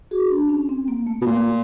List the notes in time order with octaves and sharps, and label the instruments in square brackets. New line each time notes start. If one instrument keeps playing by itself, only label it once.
[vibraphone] F#4 G#4
D4
C#4
C4
A#3
A3
[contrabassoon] B2
[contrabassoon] A#2 [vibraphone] A#3